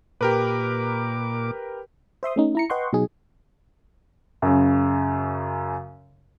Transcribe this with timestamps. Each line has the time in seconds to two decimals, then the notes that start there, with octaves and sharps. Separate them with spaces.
0.21 A#2 G4 A#4 B4 D6
2.23 C5 E5 C6 D#6
2.36 A3 C#4 D#4
2.55 E4 A#5 C#7
2.70 B4 D#5 F#5 G5 C6 C#6
2.92 B2 F#3 D#4 G#4
4.42 F#2 C#3